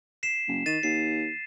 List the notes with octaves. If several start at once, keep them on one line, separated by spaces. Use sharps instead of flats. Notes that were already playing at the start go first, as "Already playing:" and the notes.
B6 C7 E7
F#1
D#3 A6 D#7 E7
D#2 C7